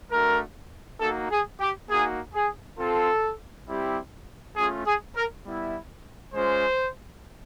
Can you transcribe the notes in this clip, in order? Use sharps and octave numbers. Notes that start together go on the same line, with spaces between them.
A3 D4 F#4 A#4
A#3 D#4 F#4 A4
G#4
G4
A#3 D#4 F#4 G#4
G#4
C4 F4 A4
G3 C4 E4 G4
A3 C#4 F4 G#4
G#4
A#4
G3 B3 E4
G#3 C#4 F4 C5